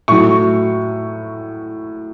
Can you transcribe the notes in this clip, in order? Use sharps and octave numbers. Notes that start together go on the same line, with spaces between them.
A2 F#3 C#6